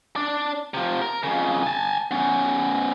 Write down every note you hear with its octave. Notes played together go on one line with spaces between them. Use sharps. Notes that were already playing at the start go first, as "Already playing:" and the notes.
D4 D5
C3 F3
A#4
F2 C#3
G#5 A5
B3 C#4